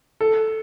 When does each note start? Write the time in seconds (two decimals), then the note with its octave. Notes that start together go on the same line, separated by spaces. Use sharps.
0.21 A4